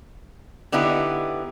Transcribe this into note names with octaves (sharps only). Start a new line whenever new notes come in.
D3 B3 D#4 E4 G4